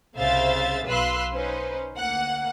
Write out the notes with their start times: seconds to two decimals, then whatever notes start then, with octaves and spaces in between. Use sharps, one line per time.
0.17 C2 C#3 C5 E5 F5 A6
0.86 B1 B4 F5 C6 E6 F#6
1.33 C#4 D#4 B4 C5
1.95 D2 A#3 F#5